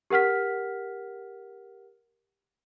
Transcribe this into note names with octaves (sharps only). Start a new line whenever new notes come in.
G4 A#4 F#5 F6 B6